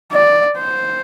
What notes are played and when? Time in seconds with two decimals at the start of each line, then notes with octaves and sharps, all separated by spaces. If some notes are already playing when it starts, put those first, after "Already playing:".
0.12 D5
0.58 C5